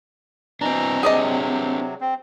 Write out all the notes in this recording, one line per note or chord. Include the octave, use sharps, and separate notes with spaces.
B2 E3 C4 D4 A#5
C3 F#3 G#4 D5 D#5
C4